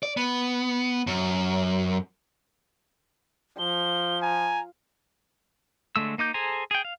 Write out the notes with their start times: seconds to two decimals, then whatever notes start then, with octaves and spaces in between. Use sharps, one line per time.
0.03 D5
0.17 B3
1.07 F#2
3.59 F3 G7
4.22 G#5 A#5
5.96 D3 G#3 A3 E6
6.18 A#3 D#4 D6 G6
6.34 G#4 A4 C5 G#5 A#5
6.71 G#4 G5
6.85 F5